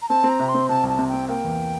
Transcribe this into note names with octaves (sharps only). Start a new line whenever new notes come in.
A#5
C4 A5
C4
A#5
C3
C6
C4
C3 A5
C2
A5
C3
C4 G5
A#3 G5
E2